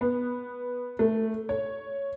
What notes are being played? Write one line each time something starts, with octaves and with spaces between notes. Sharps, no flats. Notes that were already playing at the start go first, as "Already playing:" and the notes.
B3
A3
C#5